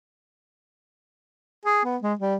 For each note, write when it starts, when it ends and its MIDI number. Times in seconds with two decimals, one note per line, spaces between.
1.65 1.82 68
1.84 1.97 59
2.02 2.14 56
2.19 2.36 55